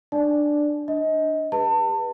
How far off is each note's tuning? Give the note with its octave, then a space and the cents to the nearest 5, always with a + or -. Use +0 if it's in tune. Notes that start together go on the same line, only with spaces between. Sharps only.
D4 +15 D5 +0 A5 -25
D4 +0 D#5 +25
G4 +45 B4 -20 A5 +35